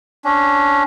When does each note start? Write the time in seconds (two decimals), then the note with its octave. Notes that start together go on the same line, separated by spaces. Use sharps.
0.25 C#4 D4